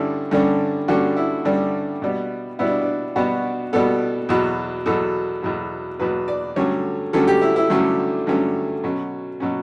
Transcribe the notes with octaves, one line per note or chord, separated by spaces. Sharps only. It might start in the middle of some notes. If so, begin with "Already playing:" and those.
Already playing: G2 D3 G3 C#4 E4
G2 D3 G3 C#4
G2 D3 G3 C#4 F#4
E4
G2 D3 G3 C#4
B2 G3 B3
B2 G3 B3 E4
D4
D4
B2 G3 B3 F#4
B2 G3 B3 A4
E2 B2 F#3
E2 B2 F#3 A4
E2 B2 F#3
E2 B2 F#3 B4
D5
G2 D3 F#3 A3 C#4 C#5
G2 D3 F#3 A3 C#4 A4
G4
E4
E4
G2 D3 F#3 A3 C#4
G2 D3 F#3 A3 C#4
B2 F#3 C#4
B2 F#3 C#4